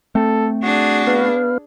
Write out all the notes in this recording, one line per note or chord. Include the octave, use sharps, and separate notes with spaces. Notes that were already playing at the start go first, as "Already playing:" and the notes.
A3 C4 A4
D4 F#4 G#4
B3 B4 F5